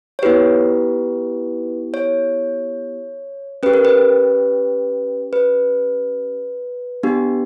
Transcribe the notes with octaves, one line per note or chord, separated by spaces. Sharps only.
C#5
B3 E4 G4 B4
C#5
C#4 G4 B4
A#4
B4
B4
B3 D4 G4